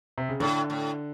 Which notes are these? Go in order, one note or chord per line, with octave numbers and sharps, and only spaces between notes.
C3
C#3
A2 D3
A2